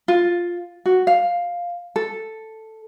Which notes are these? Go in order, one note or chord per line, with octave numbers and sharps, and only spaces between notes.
F4
F#4
F5
A4